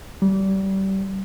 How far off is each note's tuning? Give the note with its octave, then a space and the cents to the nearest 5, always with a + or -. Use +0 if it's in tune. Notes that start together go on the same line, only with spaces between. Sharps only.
G3 -25